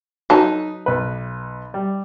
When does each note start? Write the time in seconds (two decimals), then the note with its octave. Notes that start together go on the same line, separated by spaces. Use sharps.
0.30 F#3 D#4 A4 B4 A5
0.86 B1 B4
1.74 G3